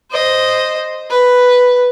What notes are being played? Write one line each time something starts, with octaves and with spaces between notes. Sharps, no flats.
C5 D#5
B4